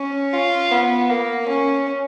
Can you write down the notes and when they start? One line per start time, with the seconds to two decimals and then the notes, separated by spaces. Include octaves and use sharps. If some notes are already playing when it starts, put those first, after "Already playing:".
Already playing: C#4
0.33 F4
0.71 B3
1.09 A#3
1.48 C#4